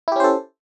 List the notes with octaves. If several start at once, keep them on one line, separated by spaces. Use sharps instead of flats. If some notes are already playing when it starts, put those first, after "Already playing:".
C#4 E4 G4 A4 C5